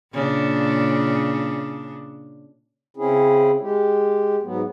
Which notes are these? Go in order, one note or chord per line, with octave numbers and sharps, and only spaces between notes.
A#2 C#3 D4
C#3 C4 C#4 E4 G#4
G#3 G4
G#2 F#3 B3